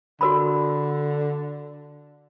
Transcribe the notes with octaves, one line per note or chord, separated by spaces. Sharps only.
D3 F#4 A#4 B5